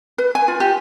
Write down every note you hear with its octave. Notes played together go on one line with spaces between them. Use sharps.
B4
G#5
F4
G4